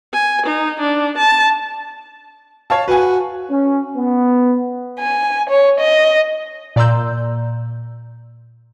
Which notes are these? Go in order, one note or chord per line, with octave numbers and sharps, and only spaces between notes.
G#5
D#4
D4
A5
C#5 F5 A5
F#4 B4 G#5
C#4
B3
G#5
C#5
D#5
A#2 D5 A#5 C6 E6 G6